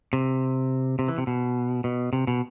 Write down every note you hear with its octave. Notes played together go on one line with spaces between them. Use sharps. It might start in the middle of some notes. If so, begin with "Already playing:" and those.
C3
C3
E3
C3
B2
B2
C3
B2